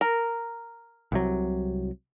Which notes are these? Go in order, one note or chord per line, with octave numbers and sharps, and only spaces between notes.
A#4
C2 C3 F#3